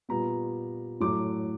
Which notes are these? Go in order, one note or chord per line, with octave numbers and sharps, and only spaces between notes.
A#2 G3 B3 A#5
A2 F#3 A3 D6